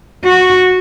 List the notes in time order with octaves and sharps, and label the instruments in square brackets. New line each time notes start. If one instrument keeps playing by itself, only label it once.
[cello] F#4